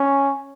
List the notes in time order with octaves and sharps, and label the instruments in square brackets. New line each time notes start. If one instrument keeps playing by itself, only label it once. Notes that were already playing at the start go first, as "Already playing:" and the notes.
Already playing: [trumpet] C#4